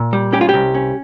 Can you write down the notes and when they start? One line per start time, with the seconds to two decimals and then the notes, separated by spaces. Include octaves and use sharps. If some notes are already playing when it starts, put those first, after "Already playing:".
Already playing: A#2
0.13 G3
0.33 C#4 G4
0.41 F4
0.49 G4
0.54 C2
0.74 C#4